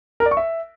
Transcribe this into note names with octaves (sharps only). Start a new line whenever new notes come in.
A#4
D5
C#6
E5